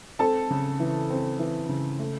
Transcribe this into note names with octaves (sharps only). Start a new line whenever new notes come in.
C4 A4 A5
C#3
E3
C4
E3
C#3
A3